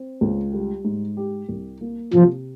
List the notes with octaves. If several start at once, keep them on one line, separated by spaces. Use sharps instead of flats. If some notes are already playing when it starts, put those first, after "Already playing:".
Already playing: C4
C#2
G3
G#2
G4
C2
A#3
C3 F3